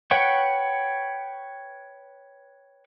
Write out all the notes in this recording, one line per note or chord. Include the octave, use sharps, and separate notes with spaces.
B4 C#5 F#5 G5 C#6